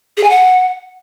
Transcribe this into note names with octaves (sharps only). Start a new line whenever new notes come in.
G#4
G#5
F#5